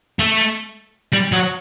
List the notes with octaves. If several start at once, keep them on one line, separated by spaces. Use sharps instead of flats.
A3
G3
F#3